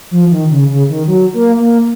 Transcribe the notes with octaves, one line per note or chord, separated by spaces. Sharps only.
F3
D#3
C#3
C#3
D#3
F#3
A#3
A#3